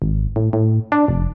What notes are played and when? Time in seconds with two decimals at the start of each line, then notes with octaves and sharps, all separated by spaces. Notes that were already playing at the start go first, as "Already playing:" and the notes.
0.02 G#1
0.36 A2
0.53 A2
0.92 D4
1.08 F1